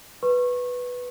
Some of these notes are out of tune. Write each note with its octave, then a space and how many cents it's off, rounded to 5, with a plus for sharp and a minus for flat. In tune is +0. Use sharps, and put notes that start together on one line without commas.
B4 +0 C#6 -25